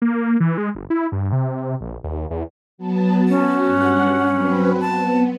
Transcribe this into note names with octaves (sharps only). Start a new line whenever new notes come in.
A#3
E3
G#3
G1
E4
G2
C3
A#1
D#2
E2
F#3 B3 A5
C#4 F#4
G2 F#5
F#3 C4 B4
B3 A5